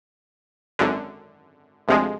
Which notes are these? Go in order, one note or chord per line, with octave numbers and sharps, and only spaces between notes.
G#1 F#2 D3
D2 C3 F3 G#3